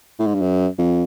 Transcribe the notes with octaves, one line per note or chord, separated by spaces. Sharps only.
A2
G#2
G2
F#2
F2